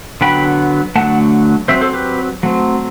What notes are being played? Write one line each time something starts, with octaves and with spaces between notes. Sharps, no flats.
D3 F#3 B3 G5 B5
D3 F#3 A3 F#5 A5
F#3 C4 C5 E5
A4 C5
G4 B4
F#3 A3 C4